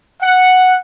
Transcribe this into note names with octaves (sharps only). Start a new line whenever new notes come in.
F#5